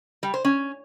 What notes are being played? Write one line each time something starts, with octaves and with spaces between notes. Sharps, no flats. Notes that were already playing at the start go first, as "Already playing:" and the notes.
G3
C5
C#4